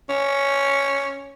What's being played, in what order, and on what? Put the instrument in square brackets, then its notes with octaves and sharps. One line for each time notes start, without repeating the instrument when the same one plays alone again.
[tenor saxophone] C#4